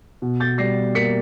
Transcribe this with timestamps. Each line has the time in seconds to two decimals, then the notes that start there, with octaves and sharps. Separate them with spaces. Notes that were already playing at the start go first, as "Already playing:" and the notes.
0.22 B2
0.40 G6 A6
0.58 G3 A#6 C7
0.95 A#3 B6 C#7